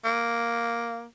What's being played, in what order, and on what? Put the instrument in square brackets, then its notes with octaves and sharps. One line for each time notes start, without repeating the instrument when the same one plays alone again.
[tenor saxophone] A#3